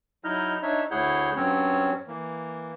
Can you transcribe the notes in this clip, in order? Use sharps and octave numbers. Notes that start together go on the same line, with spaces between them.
F#3 D#4 E4 D#5 F6 G6
D4 D#4 C#5 E5
D2 E4 G#4 C#5 F#5 G6
G2 F#3 C4 C#4 C#5
E3 A#3